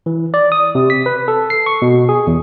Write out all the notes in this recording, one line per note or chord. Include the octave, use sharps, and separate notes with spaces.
E3
D5
D#6
C3
B6
B4
A4
C7
C#6
B2
G#4
E2